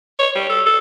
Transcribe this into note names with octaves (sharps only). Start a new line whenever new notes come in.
C#5
G3
A4
A4